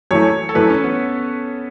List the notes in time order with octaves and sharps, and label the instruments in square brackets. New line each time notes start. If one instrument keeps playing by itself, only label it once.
[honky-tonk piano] F#2 E3 A3 [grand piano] C#5
[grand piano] A4
[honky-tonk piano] F#2 E3 A3 [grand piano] B4
[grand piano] C#4
B3